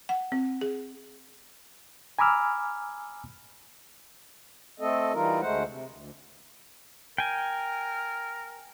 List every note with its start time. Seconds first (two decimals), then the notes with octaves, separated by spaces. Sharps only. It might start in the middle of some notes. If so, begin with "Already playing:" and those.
0.09 F#5
0.32 C4
0.61 G#4
2.19 G#5 A#5 B5 D6 E6 F6
4.80 A3 C4 A4 D#5
5.13 E3 G3 D#4 F4 A#4
5.41 D2 G#3 A3 C5 F#5
5.66 C3
5.89 D2
7.18 A#4 G5 G#5